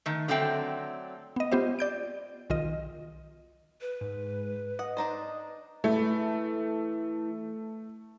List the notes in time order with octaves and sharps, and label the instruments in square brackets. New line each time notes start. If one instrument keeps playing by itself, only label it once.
[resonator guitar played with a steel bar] D#3 A3
D3 F#3 A3 C4 G5
[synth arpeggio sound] B3 D#5
B3 F4 G4 C5 E5
D5 G6 D7
B1 D#3 F4 D#5
[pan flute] B4
[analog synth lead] G#2
[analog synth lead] D#5 [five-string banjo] F#5
[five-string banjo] D4 D#4 C5
[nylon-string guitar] E3 E4 [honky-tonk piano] A3